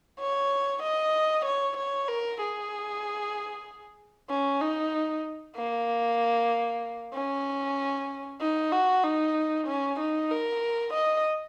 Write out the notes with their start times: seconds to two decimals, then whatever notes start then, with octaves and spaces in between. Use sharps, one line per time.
0.20 C#5
0.83 D#5
1.45 C#5
1.77 C#5
2.09 A#4
2.41 G#4
4.30 C#4
4.61 D#4
5.56 A#3
7.14 C#4
8.41 D#4
8.72 F#4
9.04 D#4
9.67 C#4
10.00 D#4
10.31 A#4
10.94 D#5